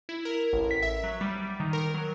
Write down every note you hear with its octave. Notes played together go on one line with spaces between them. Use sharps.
E4
A#4
A1
B6
E5
F#3
G3
D#3
A#4
F#3